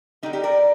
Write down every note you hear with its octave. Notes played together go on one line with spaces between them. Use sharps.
D3 G3 D#4 G4
D#4 G4
A#4 D5